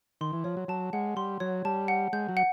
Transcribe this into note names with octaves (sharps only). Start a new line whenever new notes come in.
D#3 C6
E3
F3 C#5
F#3
F#3 A5
G#3 F#5
G3 C6
F#3 C#5
G3 A5
F#5
G#3 G6
F#3
F#5